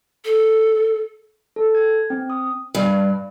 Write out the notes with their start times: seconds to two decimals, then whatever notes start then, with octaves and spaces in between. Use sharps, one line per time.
0.25 A4
1.56 A4
1.75 G#6
2.10 C4
2.30 D#6
2.75 G2